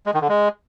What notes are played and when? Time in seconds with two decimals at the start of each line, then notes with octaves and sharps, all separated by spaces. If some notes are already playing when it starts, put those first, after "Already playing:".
0.06 G#3
0.14 D#3
0.21 D3
0.29 G#3